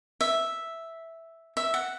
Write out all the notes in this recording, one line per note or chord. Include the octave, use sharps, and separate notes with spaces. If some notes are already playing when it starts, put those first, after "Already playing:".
E5
E5
F#5